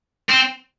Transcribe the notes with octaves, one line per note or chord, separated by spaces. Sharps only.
C4